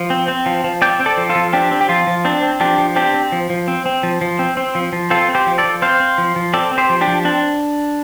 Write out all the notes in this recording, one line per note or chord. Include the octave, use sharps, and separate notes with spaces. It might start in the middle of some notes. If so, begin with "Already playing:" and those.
Already playing: F3
C4
C4
F3
F3
C4 D5 G5
C4
A4 D5
F3
F4 A4
F3
C4 D4 G4
C4
G4
F3 F4
F3
C4 D4
C4
F3 D4 G4
F3
C4 D4 G4
C4
F3
F3
C4
C4
F3
F3
C4
C4
F3
F3
C4 F4 A4
C4
G4 C5
F3
A4 D5
F3
C4 C5 F5
C4
F3
F3
C4 A4 D5
C4
G4 C5
F3
D4 G4
F3
C4 D4